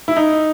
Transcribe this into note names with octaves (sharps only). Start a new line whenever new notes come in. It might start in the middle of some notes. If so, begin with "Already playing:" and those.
E4
D#4